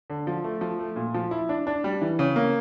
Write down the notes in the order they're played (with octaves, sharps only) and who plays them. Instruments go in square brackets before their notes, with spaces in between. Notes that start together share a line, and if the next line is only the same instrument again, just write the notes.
[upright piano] D3
F3
A3
F3
A3
A#2
F3
E4
D4
D4
G3
E3
C#3
A#3